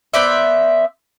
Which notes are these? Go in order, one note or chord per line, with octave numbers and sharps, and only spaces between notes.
B3 C5 D5 E5